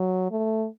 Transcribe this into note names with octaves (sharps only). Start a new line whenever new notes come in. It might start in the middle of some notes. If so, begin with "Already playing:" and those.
Already playing: F#3
A3